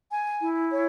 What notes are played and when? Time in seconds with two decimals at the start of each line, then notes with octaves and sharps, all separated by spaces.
0.11 G#5
0.41 E4
0.71 C#5